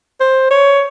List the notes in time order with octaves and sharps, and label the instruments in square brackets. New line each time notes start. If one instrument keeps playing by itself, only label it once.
[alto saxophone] C5
C#5